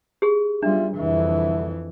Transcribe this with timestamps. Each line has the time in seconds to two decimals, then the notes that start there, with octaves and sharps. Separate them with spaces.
0.22 G4 G#4
0.63 B1 G3 D4 F4 E5
0.97 C2 F2 D3 E3 E5